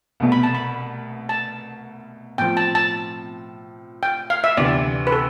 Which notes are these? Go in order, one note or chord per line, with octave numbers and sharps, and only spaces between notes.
C2 B2 A3
B5
A5
B5
A5
A2 F3 C4 G5
A5
A5
G5
F5
E5
D2 C3 E3 D5
B4
A4